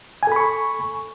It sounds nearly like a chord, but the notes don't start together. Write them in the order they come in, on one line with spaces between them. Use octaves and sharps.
G#5 A4 B5 C#6